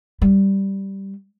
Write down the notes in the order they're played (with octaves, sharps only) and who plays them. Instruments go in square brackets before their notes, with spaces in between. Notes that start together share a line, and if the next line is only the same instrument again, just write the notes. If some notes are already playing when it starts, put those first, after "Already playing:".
[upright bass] G3